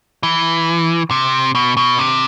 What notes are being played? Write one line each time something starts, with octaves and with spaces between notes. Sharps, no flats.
E3
C3
B2
B2
C3